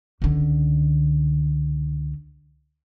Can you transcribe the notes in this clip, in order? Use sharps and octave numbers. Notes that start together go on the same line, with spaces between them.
C#2 D3